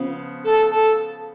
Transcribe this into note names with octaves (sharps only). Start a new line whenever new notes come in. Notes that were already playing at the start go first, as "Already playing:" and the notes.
Already playing: C#3 F3 B3
A4
A4